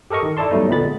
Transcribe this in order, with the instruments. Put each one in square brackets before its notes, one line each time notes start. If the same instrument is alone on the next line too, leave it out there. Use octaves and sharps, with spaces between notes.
[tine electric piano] G4 A4 A#4 D#5 C#6
D#3
E4 A4 D5 A5 C6
F#3 G3 A3 B3 D#4
A#2 D3 B3 C4 B5 A6
G#3